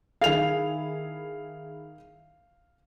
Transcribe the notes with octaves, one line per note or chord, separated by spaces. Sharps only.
D#3 E4 G#4 F5 F7